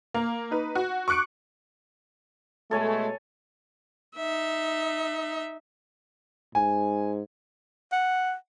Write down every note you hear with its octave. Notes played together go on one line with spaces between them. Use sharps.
A#3
D#4 B4
F#4
C#6 D6 F#6 C#7 D7
B2 G#3 A3 A4 C#5 G#5
D#4 E5
G#2 G#5
F#5